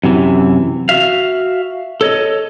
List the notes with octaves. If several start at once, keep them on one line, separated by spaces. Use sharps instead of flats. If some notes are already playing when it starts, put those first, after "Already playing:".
F#2 C3 E3
F#4 E5 F5
A4 C#5 D#5